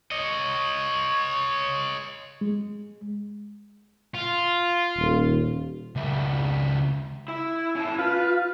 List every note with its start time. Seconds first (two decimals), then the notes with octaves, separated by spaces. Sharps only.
0.12 C#5 D#5
2.41 G#3
4.15 F4
4.98 D#1
5.96 C#2 E4
7.28 E4
7.75 C#4 E4 A5
7.99 F4 B4